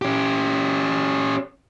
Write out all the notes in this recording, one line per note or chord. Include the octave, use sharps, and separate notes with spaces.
C#4 G4